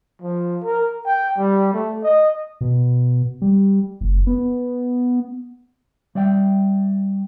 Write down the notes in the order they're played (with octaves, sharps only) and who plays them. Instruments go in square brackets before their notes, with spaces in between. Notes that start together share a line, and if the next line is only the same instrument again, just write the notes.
[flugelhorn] F3
A#4
G5
G3
A3
D#5
[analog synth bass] B2
G3
F#1
B3
[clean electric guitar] G3 D5 E5 G5